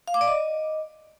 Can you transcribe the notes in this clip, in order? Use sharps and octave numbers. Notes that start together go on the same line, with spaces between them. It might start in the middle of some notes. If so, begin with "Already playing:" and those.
F5
D6
D5
D#5